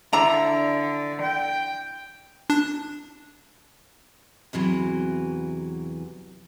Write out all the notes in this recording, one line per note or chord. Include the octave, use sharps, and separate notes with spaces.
D3 D4 E4 A#5
G5
D4
E2 C3 E3 F#3